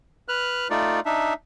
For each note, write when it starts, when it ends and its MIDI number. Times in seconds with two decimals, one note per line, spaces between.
0.28 0.68 71
0.28 0.68 89
0.28 0.68 90
0.70 1.00 57
0.70 1.00 63
0.70 1.00 65
0.70 1.00 74
1.06 1.34 62
1.06 1.34 63
1.06 1.34 76